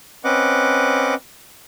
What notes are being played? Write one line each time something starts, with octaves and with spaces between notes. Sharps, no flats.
C4 C#4 B4 D#5 F#5 D6